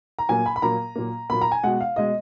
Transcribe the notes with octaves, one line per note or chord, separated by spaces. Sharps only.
A#5
A#2 F#3 A#3 G#5
B5
B5
A#2 F#3 A#3 A#5
A#2 F#3 A#3
A#2 F#3 A#3 B5
A#5
G#5
B2 G#3 F#5
F5
B2 G#3 D#5